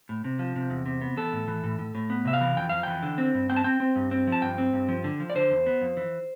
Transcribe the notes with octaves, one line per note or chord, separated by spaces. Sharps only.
A2
C3
F3
C3
E2
C3
B3
E3 A4
A2
E3
A2
A2
A2
B3
C3 E5
F5
E3
F2 G5
F2 F5
E3 G5
D3
C4
G2
C4 G5
A5
C4 G5
C4
G2
C4
F3
A5
G2 G5
C4
G2
F3
D3
F3
D5
D3 C5
E2
B3
F2
E3